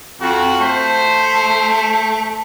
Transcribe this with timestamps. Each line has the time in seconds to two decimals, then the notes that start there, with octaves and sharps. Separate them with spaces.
0.21 F2 F#4
0.60 A3 C5